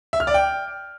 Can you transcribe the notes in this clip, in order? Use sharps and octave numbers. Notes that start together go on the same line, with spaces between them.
E5
F6
D5
G5